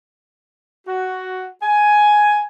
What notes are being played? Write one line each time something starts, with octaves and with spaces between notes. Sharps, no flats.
F#4
G#5